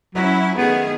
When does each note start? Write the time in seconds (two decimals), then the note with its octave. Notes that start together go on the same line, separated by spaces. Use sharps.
0.15 F#3 C#4 E4
0.57 D#3 A3 B3 G#4